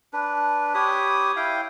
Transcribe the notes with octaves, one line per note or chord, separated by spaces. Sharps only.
D4 B4
G4 C#5 B5 D#6
E4 F5 G5